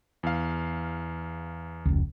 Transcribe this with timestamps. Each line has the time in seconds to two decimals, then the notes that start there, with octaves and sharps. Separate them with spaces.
0.23 E2 F5
1.85 F1 C#2